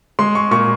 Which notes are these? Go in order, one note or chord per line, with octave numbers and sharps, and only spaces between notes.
G#3 C6
C#6
A#2 C#6